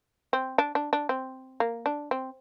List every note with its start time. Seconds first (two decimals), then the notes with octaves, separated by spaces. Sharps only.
0.33 C4
0.58 D4
0.75 D4
0.93 D4
1.09 C4
1.60 A#3
1.86 D4
2.11 C4